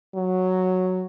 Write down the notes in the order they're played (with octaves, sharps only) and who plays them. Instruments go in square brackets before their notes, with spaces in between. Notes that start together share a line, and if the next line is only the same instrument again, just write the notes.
[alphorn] F#3